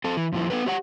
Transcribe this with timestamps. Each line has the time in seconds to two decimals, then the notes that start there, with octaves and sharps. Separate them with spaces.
0.04 C4 A4
0.17 E3
0.33 F2 A#2 F3 E4
0.50 B3 C4 A4 B4
0.66 G4 C#5 F#5